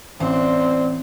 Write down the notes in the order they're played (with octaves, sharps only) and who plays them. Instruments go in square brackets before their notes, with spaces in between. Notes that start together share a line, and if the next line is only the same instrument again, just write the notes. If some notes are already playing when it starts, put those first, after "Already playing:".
[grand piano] A1 [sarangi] C4 [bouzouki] D4 C5